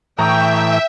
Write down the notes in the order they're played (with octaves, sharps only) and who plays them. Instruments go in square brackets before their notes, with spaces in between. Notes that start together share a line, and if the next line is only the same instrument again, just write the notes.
[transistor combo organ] A2 E3 [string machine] E5 [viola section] G5 [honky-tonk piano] A#5 C#6 D#6